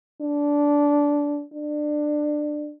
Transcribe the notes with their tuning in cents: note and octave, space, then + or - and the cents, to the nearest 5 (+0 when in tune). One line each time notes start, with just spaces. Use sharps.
D4 -15
D4 +20